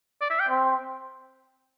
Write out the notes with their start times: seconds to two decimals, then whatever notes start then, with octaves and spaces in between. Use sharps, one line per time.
0.21 D5
0.30 E5
0.40 G5
0.49 C4